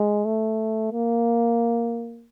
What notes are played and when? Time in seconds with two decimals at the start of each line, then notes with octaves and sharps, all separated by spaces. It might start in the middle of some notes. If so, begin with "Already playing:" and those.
Already playing: G#3
0.25 A3
0.92 A#3